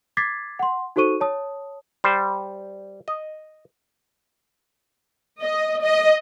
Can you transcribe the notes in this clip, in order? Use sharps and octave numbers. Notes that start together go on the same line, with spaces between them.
D6 G#6 A6 B6 C7
F#5 C6
D#4 F#4 A4 C5 C#6 D#7
C#5 A5 D#6
G3 C5
D#5
D#5
D#5